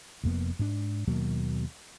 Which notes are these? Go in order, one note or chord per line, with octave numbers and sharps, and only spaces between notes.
F1 F2 A#3 B3
G#2 D4
D#2 B2 F#3 A#3